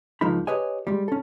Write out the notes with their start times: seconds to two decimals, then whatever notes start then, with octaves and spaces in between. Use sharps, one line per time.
0.21 C#2 F3 G#3 A#3 D#4 B5
0.47 G4 B4 C#5 D#5 G#5
0.87 G3 G#3
1.08 C#4 A4